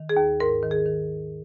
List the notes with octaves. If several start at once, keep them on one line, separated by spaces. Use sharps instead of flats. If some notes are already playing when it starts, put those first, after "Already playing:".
Already playing: D#3
G#4
D#2
G#2 A#4
D#3
G#4
D#3